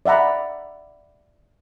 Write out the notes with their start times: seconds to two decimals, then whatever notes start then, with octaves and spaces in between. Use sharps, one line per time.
0.06 D5 E5 F#5 A#5 B5